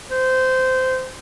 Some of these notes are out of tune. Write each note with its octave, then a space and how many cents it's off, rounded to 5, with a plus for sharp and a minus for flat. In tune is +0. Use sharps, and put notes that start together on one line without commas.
C5 -15